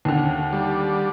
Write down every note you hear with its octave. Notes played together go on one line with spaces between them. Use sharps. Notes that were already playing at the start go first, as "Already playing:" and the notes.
D#2 D3
G3